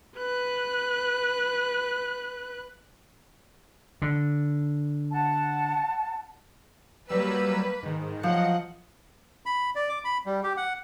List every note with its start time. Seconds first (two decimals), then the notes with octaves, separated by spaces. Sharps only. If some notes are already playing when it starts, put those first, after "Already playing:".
0.17 B4 F#6
4.02 D3
5.12 F#5 A5
7.09 F#3 G3 A#3 B4 E6
7.83 G#2 D#3
8.23 F3 F#3 D#5 F#5
9.46 B5
9.75 D5
9.89 D6
10.05 B5
10.26 G3
10.43 G4
10.57 F#5